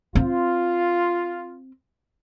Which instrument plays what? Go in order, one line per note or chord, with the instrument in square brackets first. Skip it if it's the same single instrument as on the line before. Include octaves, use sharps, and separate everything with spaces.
[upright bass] C4 [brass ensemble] F4